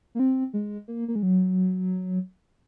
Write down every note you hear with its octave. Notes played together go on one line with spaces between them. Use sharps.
A#3
C4
G#3
A#3
A#3
G#3
F#3